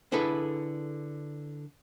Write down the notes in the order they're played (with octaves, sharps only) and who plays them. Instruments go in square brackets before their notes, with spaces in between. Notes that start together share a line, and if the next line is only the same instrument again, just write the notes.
[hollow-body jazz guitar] D3 E4 G#4 A4 B4